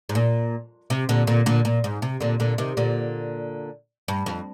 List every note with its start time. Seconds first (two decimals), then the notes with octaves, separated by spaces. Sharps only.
0.09 G#2
0.15 A#2
0.90 C3
1.09 A#2 D3
1.27 A#2 D3
1.46 A#2 D3
1.65 A#2
1.84 G#2
2.02 C3
2.20 A#2 D3
2.40 A#2 D3
2.58 C3 D#3
2.77 A#2 D3
4.08 G2
4.26 F2